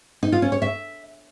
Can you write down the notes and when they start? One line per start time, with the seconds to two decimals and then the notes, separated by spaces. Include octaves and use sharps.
0.23 D#4
0.32 F4
0.42 C#4
0.52 C#5
0.62 E5